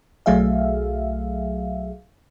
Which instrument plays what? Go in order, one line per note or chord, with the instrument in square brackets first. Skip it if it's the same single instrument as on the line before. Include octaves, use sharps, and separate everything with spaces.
[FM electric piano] B1 F#3 A3 G#4 E5 F5